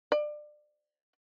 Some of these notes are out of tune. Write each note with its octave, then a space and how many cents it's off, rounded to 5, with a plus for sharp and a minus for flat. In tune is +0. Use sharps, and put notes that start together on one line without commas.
D5 +25